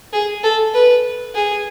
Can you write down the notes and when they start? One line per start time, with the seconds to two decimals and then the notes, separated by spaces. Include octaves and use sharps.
0.13 G#4
0.43 A4
0.74 B4
1.35 G#4